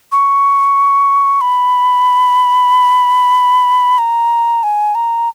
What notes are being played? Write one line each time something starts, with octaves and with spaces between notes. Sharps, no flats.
C#6
B5
A#5
G#5
A#5